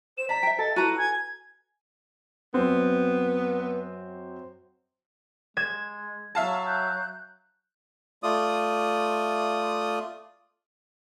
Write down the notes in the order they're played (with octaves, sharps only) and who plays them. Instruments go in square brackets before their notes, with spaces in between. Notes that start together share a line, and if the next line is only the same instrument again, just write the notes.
[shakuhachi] C5 [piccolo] E7
[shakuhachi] C5 [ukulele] D5 [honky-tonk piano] A5 A#5 [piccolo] B6
[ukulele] E5 G5
[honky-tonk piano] A4 [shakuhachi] D#5 [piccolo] A6
[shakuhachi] E4 [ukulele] F#4 B4 A#5 [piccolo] D#7
[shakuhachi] G#5 [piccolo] G#6
[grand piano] F#2 C4 [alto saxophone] B3
[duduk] G#3 [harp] G#6 E7
[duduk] F#3 [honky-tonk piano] E5 F5 A5
[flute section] F#6 G6
[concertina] A3 F4 D5 D#6